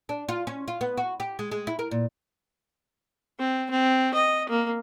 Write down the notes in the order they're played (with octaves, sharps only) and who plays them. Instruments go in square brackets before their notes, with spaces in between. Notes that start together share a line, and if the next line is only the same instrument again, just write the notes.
[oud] D4
F4
C#4
F4
B3
F#4
G4
G#3
G#3
E4
A#4
A#2
[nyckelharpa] C4
C4
D#5
A#3